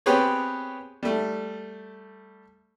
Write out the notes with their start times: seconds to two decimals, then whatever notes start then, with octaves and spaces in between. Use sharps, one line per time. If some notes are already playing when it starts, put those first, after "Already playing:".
0.06 B3 C4 G4 G#4 B4 C#5
1.03 G3 A3